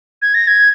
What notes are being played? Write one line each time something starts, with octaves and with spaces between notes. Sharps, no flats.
G#6
A#6
G#6